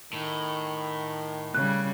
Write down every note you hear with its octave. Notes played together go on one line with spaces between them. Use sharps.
A2 D#3
C#3 G3 F#6